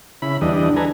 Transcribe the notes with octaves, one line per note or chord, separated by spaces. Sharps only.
C#3 E4 B5
E2 D3 E3 G3 D4 D#5
D4 A4 B4 G#5 A#5